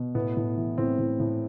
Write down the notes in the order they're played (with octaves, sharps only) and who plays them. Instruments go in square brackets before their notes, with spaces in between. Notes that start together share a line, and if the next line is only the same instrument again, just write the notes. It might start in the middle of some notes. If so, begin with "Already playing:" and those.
Already playing: [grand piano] B2
A2 B3
A2
E3
A2 C4
A2
A2